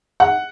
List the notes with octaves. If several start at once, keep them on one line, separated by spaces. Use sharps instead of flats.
F#5